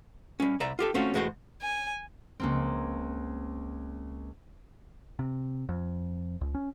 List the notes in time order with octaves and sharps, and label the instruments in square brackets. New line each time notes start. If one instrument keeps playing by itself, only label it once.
[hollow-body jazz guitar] G3 C#4
C2 D5 E5 A#5
F4 G4 A4
A3 C4 C#4 F4 F#4
E2 A2 G#3 F#4 G#4 C5
[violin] G#5
[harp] C#2 A#3 C4
[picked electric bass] C3
F2
C#2
C#4